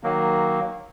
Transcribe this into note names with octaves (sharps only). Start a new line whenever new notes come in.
D#3 F#3 A#3